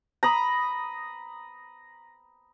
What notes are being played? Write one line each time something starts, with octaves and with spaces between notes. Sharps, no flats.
A#5 B5 D#6